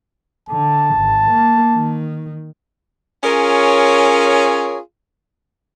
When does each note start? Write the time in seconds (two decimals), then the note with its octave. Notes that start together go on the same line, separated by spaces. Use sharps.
0.49 D3 A5
0.96 G#1
1.30 A#3
1.75 D#3
3.24 C#4 F4 G#4 A#4 C#5